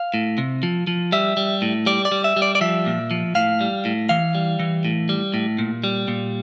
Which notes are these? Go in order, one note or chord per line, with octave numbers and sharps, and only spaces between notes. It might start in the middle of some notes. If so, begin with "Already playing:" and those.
Already playing: F5
A2
C3
F3
F3
G3 E5
G3
A2
G3 D5
D5
G3
E5
G3
D5
D5
F3 E5
A#2
F3
A2 F5
G3
A2
E3 F5
G3
E3
A2
G3
A2
A#2
G3
A#2